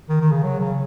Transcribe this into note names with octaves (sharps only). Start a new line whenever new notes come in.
D#3
D#3
C#3
F#3
C#3